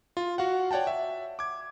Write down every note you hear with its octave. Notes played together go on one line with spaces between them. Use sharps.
F4
F#4 F5 F#5
C#5 D5 F#5 G5 A5
E5
D6 G#6